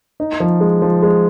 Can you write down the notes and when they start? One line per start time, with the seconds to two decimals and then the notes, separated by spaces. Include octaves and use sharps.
0.20 D#4
0.40 F3
0.61 G#3
0.82 F3
1.03 G#3